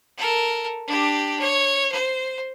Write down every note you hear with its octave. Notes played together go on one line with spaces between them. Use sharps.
A4 A#4
D4 G4
C#5
C5